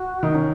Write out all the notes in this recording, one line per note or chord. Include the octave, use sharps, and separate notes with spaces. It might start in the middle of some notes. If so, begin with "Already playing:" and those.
Already playing: F#4
D#3 D#4
C#4